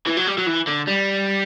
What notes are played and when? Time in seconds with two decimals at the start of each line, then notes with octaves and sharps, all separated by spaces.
0.06 E3
0.17 F#3
0.27 G3
0.37 F#3
0.46 E3
0.67 D3
0.87 G3